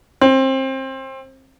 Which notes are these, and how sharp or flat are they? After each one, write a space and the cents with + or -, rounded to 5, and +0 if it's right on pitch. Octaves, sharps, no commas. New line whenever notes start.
C4 +25